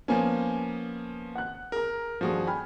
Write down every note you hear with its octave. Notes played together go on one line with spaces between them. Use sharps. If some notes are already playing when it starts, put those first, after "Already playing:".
F3 A#3 B3 C#4 G#5
F#5 F#6
G#4 A#4 A#5
D#1 G2 F3 F#4 G#4
G5 G#5 B5 F6